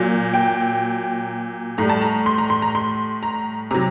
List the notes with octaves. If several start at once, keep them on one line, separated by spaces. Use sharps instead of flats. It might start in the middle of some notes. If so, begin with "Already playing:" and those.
Already playing: A#2 F#3
G5
A2 G3 A#5
A5
A#5
C6
A#5
C6
A#5
C6
A#5
C3 F#3 A#5